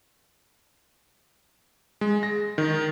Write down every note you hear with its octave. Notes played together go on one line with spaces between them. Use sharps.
G#3
A#6
D#3